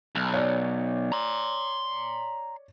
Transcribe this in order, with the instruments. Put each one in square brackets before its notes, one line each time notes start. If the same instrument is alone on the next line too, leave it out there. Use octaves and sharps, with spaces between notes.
[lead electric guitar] B1
[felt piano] C#5 D5
[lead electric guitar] A#5 C6